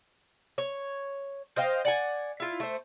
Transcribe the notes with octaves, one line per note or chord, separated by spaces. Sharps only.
C#5
C5 D#5 F5 G5
D5 F#5 G#5
E4 F4
A3 C5